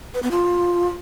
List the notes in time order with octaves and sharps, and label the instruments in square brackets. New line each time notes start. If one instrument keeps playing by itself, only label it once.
[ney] B4
B3
F4